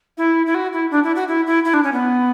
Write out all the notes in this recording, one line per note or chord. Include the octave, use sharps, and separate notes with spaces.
E4
E4
F#4
E4
D4
E4
F#4
E4
E4
E4
D4
C#4
B3